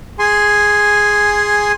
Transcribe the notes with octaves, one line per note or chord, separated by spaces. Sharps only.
G#4 G#5 C6